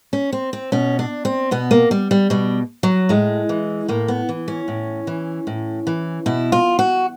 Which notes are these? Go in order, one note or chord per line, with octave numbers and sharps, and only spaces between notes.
C#4
C4
C4
B2 C#4
D4
C4
B2 B3
A#3
G3
G3
B2 G3
F#3
A2 G#3
E3
A2 A#3
B3
E3
C#4
A2
E3
A2
E3
B2 E4
F4
F#4